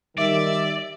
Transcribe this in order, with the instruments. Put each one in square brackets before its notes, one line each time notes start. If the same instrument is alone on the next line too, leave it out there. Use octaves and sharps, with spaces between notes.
[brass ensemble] D#3 G3 [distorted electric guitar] D5 [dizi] E5